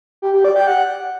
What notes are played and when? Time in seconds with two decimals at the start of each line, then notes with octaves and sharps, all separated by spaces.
0.22 G4
0.33 G4
0.44 D5
0.56 G5
0.67 F#5